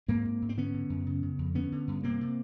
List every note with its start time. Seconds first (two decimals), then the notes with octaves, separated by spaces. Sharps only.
0.08 G#2 A#3 C4
0.25 G#2
0.42 G#2
0.49 C4
0.57 D3 B3 C#4
0.73 D3
0.90 F#2
1.07 C#3
1.23 C#3
1.39 F2
1.55 D3 B3 C#4
1.72 D3
1.88 G2
2.03 C3 A#3 C4
2.21 C3